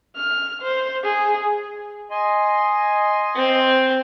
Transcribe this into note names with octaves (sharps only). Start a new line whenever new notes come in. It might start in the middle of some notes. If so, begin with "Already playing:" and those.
F6
C5
G#4
D#5 G#5 C6
C4